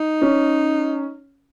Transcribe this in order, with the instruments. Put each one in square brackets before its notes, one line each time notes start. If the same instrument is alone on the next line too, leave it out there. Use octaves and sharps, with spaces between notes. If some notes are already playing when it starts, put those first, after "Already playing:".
Already playing: [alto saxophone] D#4
[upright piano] C#4